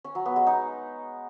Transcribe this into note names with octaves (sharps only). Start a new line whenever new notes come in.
C#4
F#3
B3
G#3
D#4